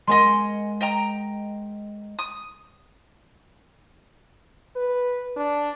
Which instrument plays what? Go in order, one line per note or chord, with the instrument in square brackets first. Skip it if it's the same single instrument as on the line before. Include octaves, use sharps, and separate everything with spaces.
[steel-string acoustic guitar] G#3 A#4 F#5 [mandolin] D#5 G#5 C6
[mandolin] D#5 G5 A#5
D#6
[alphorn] B4
D4